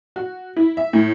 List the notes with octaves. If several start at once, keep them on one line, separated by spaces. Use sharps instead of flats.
F#4
E4
E5
A2